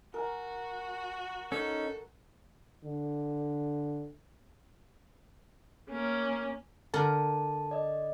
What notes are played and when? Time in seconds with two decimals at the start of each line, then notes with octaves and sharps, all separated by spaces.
0.14 F#4 A#4 G#5
1.52 C#4 D#4 A4
2.84 D3
5.90 A#3 C#4
6.94 D3 A#4 D5 A5
7.71 D5 D#5